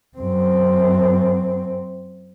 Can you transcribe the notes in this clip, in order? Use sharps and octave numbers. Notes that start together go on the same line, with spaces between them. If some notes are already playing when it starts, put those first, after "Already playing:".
F#2 C4